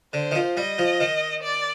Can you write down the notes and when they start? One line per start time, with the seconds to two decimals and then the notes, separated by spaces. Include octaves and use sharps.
0.13 D3 C5
0.31 D#3
0.35 F3
0.57 G3 D#5
0.79 F3
1.00 D#3
1.43 D5